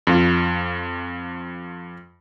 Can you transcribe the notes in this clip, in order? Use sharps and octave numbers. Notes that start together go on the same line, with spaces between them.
F2 F4